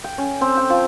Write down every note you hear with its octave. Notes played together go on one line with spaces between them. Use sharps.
G5
C#4
C4
G5
F3